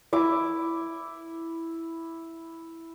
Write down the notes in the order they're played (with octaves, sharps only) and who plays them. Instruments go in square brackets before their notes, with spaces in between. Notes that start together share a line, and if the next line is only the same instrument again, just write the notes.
[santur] E4 D6